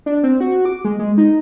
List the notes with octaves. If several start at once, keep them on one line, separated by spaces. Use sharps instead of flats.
D4
C4
F#4
D6
G#3
G#3
D#4